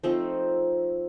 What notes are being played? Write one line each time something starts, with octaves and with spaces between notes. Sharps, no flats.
F3 A3 C4 D#4